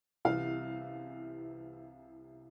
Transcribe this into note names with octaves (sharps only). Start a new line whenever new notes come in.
C2 C3 E3 F5